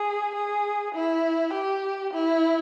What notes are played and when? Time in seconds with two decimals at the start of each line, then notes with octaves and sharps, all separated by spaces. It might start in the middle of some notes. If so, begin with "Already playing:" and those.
Already playing: G#4
0.35 G#4
0.95 E4
1.53 G4
2.13 E4